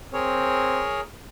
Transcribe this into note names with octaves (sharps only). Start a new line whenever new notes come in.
C4 G#4 A#4 C#5